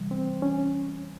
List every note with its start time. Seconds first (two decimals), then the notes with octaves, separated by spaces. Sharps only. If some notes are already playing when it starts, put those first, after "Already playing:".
Already playing: C3 E3 G3
0.11 C4
0.42 C#4